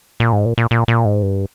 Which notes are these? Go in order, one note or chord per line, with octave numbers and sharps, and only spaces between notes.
A#2
G#2
A#2
A#2
A#2
A#2
G#2
G2